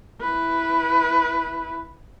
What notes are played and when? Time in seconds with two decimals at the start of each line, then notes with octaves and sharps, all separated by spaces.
0.21 E4 B4